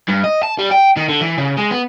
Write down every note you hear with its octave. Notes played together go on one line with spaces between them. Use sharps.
G2
D#5
A5
G3
G5
D#3
D3
E3
C#3
G#3
B3